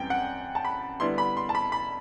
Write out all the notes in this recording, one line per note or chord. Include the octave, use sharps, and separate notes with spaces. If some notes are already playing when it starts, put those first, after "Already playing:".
Already playing: F#2 E3 G3 C4 G5
F#5
A5
B5
D3 G3 B3 E4 C6
B5
C6
A5
B5
B5